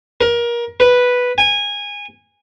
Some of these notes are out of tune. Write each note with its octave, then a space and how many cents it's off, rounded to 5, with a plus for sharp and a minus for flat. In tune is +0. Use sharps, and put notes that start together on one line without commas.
A#4 +25
B4 -5
G#5 -20